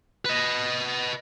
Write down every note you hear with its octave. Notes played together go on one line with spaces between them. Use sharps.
B4 D#5